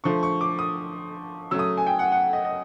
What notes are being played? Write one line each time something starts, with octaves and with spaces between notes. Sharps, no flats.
D3 F3 A3 C#6
C#6
D6
D#6
C#3 F#3 A3 E6
D#6
G#5
G5
F#5
F#5
D#5
D#5